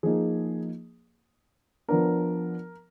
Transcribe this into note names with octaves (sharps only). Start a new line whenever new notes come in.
F3 A#3 D#4 G#4
F3 B3 D4 A#4